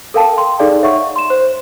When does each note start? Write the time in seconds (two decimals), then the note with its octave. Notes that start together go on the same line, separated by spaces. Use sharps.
0.14 A4 A#4 F5 G5 A5
0.38 G5 C6
0.59 D#4 G#4 A4 D5 F5
0.83 C#5 E5 F#5 C#6
1.16 C6 E7
1.30 C5